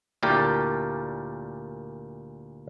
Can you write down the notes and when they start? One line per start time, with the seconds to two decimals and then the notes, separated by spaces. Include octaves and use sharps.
0.23 D2 A#2 E4 G4 A#4 D5